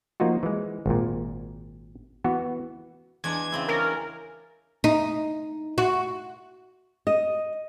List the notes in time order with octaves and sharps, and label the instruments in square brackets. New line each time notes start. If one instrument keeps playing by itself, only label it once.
[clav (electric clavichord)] F3 A#3 D#4 F4 F#4
E3 G#3
G#1 A#2
E3 B3 F#4
[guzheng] E2 G#3 D4 [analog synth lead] G#6
[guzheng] C#3 C4 E4
[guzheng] C#4 D5 [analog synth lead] A#4
[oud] D#4
F#4
[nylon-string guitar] D#5